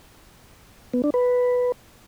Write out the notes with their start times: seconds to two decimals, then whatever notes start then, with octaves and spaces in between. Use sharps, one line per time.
0.94 B3
1.04 D4
1.14 B4